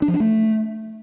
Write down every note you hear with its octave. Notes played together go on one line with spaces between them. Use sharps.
D4
F3
D4
A3